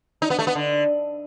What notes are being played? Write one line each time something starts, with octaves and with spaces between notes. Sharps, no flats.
D#4
B3
A3
B3
D3